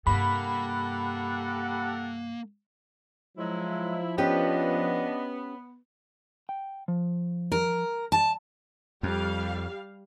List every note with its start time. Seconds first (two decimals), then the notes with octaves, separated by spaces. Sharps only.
0.07 G2 C3 A#3 G4 A4 F#5 B5
3.38 G#2 F3 F#3 G#3 E4
4.18 B3 C#4 D4 G4 B4 D#5
6.49 G5
6.88 F3
7.52 A#4
8.12 A5
9.03 F2 G3 F5